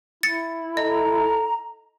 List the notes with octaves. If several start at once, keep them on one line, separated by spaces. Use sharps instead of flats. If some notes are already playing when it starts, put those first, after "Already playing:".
E4 A6 C#7
A4 D#5 A#5